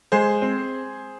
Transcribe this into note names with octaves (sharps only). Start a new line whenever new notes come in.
G#3 G#4 C5
C4